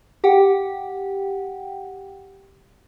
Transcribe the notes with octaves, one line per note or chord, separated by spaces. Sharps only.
G4 F#5 G5